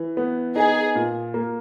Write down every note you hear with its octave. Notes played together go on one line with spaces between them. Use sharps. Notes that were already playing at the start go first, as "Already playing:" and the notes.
Already playing: E3
B3
D#4 G#4
A#2
A#3